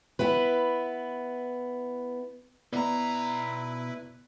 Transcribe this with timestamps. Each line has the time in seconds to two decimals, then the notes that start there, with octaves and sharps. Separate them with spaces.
0.19 B3 E4 B4
2.73 B2 B3 E4 B4 D5 A#5